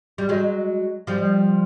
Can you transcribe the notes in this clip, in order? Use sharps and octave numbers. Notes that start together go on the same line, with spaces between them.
G3
F#3 G#3
F3 G3